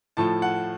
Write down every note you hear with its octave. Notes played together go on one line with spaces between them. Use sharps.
A2 F3 A3 A5
F#5